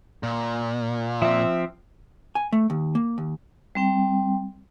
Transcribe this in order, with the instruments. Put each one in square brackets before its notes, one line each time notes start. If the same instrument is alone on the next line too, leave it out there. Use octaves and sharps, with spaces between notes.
[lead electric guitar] A#2
[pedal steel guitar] F3 C4 [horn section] E5
[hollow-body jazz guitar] G#5
A3
D#2
A#3
D#2
[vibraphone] G3 C4 G5